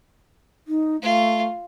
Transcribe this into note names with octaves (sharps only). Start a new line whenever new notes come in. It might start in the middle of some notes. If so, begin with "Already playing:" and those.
D#4
A3 F4